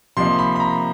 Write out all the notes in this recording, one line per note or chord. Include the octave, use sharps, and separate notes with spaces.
C3 F3 A#3 D#4 C6
B5
B5
A#5